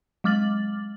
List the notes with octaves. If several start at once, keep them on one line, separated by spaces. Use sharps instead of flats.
F#3 G#3 D6 F6 A6 F#7